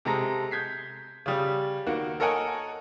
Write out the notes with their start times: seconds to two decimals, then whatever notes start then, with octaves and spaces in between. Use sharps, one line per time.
0.05 C3 G#3 A4 A#5 A#6
0.51 G6 G#6 B6 C7
1.26 C#3 G3
1.87 D#3 A#3 F#4
2.20 A4 A#4 C#5 D#5 F#5 G#5